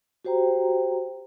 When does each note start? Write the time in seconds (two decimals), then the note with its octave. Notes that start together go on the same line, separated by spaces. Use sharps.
0.25 F#4 G4 C5 G5 A#5